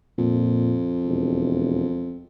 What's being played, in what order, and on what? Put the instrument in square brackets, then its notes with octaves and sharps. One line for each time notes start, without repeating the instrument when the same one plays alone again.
[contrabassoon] F2 [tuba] A#2
[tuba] E1